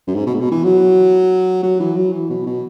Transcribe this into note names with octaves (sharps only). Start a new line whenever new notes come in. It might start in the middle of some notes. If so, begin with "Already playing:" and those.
F#2
G#2
B2
G#2
B2
E3
F#3
F#3
E3
F#3
E3
B2
B2